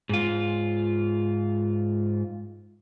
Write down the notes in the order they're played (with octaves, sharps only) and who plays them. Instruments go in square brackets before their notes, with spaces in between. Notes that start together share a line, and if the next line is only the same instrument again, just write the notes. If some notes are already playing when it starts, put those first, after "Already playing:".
[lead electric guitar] G#2 F4